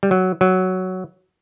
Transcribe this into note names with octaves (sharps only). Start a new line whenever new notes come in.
G3
F#3
F#3